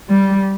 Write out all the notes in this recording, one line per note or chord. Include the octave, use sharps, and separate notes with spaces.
G3